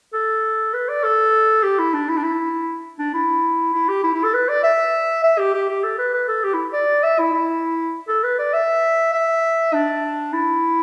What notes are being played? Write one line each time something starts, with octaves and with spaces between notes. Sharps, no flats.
A4
B4
D5
A4
G4
E4
D4
E4
D4
E4
D4
E4
E4
G4
E4
E4
A4
B4
D5
E5
E5
G4
G4
G4
A4
B4
B4
A4
G4
E4
D5
E5
E4
E4
A4
B4
D5
E5
E5
D4
E4